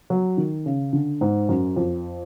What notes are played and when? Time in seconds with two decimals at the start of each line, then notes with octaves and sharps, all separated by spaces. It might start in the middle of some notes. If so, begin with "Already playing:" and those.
0.10 F#3
0.37 D#3
0.66 C#3
0.93 D3
1.21 G#2
1.49 F#2
1.76 F2